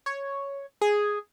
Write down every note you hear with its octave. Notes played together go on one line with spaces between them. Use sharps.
C#5
G#4